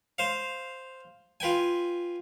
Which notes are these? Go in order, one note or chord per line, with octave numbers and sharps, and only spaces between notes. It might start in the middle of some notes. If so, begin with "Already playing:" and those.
C5 F5
F4 B4 G5 G#5